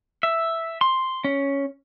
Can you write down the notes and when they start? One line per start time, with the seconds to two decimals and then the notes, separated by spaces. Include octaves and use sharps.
0.23 E5
0.81 C6
1.24 C#4